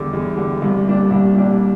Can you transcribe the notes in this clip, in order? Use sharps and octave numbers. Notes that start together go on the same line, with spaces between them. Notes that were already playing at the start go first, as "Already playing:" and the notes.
Already playing: E2 D3 G3
E2
D3 G3
C2
A#2 G3 D4
C2
A#2 G3 D4